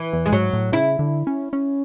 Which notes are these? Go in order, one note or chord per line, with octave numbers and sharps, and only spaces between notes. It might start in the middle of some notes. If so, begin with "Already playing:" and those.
Already playing: E3
E2
G#3
G#2 F#3
A2
C#3 E4
D3
C#4
C#4